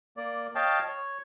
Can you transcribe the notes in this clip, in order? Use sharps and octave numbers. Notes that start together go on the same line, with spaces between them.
A#3 D5
C#5 D#5 F5 G5 A5
C#5